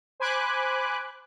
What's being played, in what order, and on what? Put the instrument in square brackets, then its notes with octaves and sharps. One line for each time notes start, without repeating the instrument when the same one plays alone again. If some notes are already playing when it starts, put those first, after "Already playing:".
[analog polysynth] C5 G#5 B5 D6 F#6